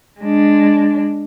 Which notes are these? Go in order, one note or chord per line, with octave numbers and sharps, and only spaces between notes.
G#3 D4